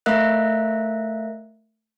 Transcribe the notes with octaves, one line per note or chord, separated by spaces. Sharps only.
A3 A#4 E5 F5 F#6